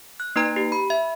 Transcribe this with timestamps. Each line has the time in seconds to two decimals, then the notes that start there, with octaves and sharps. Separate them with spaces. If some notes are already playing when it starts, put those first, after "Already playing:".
0.20 F#6
0.36 A#3 D#4 B4 A#5
0.56 G4
0.72 B5
0.90 E5